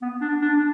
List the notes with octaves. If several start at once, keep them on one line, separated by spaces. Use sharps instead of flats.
B3
D4
D4
D4